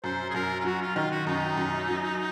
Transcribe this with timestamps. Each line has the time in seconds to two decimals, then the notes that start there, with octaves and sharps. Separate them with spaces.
0.04 F#2 C5
0.30 G#4
0.35 F#2 A#4
0.60 F4
0.65 F#3 F#4
0.81 F4
0.96 D#3 F4
1.11 F#4
1.26 F#2 D#4
1.58 F#2
1.88 F#3